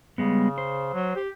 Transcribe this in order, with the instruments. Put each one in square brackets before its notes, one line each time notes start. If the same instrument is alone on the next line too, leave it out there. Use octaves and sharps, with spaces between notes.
[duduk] C#3 [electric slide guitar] G3 G#3 B3
[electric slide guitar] C5
[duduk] F#3
G4